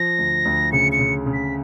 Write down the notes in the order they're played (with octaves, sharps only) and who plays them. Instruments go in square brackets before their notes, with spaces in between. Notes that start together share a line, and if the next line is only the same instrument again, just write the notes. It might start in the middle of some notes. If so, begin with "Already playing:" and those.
Already playing: [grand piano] F3 [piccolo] A#6
[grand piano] D2
D2
[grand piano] C#3 [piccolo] C#7
[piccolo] C#7
[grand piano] C#3
C#3
[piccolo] B6